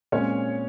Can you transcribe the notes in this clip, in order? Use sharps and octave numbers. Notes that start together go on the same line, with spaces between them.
A#2 G#3 C4 C#4 C#5